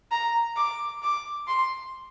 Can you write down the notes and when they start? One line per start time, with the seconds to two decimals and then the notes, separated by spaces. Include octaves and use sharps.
0.11 A#5
0.56 D6
1.03 D6
1.48 C6